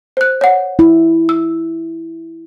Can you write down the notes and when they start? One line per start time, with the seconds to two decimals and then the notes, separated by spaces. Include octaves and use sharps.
0.17 C5 F#6
0.41 C#5 F#5
0.79 E4
1.29 E6